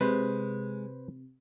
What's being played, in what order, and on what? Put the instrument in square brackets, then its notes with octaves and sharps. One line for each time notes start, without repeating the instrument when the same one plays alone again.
[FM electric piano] C3 [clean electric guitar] G#3 [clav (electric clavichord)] B4 C5